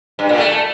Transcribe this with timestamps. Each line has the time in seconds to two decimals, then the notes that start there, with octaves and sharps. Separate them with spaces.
0.19 G2
0.29 A#2
0.39 A3